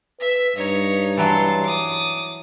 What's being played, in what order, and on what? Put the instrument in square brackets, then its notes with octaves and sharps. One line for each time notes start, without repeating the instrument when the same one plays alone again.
[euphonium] B4 [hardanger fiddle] E5
[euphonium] G2 [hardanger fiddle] D#4 C#5
[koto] E3 F#3 [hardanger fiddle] A5 C6
[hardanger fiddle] D6 D#6